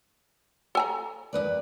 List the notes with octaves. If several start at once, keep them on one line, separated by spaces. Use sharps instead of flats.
A4 G#5 A#5
D#2 B4 D5